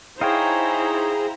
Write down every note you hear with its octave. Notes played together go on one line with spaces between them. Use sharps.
D#4 E4 G#4 C5 C#5 F5 G5 A#5